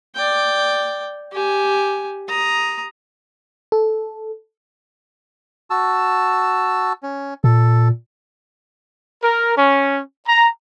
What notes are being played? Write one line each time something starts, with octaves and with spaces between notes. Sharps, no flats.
D5 G5
G4 G#5
A#5 D#6
A4
F#4 A5 E6
C#4
A#2 A4
A#4
C#4
A#5